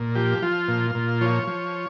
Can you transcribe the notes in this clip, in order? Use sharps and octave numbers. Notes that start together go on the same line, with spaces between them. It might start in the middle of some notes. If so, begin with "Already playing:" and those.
Already playing: A#2
F3 G4
F3 F4
A#2
A#2
F3 C#5
F3